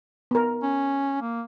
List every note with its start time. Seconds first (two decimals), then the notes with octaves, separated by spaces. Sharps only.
0.31 B3 A#4
0.63 C#4
1.22 A#3